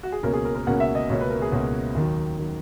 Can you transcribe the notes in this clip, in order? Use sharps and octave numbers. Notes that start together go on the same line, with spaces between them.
F#4
G#4
C#2 B2 A#3 C#4 A#4
G#4
A#4
A#4
C#2 B2 A#3 C#4 F#5
E5
D#5
C#2 B2 A#3 C#4 C#5
B4
A#4
G#4
C#2 B2 A#3 C#4 F#4
D#2 D#3 F#3
D#3 F#3